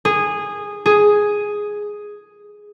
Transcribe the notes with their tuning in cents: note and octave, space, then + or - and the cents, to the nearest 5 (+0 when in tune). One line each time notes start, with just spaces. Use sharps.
G#4 -15
G#4 +0